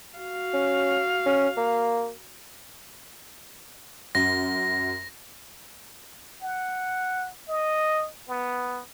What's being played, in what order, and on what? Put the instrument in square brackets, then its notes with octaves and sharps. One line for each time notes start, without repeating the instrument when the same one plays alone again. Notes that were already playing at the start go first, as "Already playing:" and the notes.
[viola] F#4 F5
[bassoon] C#4
C#4
A#3
[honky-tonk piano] F#2 [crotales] A#6
[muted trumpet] F#5
D#5
B3